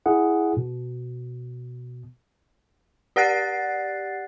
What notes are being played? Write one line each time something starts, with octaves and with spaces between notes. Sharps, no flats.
E4 G#4 F#5
B2
G4 D5 F#5 F#6 A6 C7